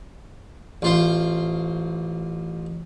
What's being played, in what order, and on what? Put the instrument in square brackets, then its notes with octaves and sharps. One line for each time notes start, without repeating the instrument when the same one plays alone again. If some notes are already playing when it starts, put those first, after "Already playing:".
[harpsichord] A1 F4 C5